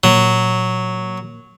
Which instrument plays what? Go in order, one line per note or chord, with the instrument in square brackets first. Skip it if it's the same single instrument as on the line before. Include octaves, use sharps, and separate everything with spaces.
[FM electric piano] A#2 [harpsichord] F#3